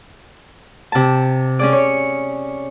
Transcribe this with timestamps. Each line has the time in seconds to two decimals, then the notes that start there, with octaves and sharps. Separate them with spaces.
0.92 C3 A5
1.59 C#4 G#4 D5
1.73 C#5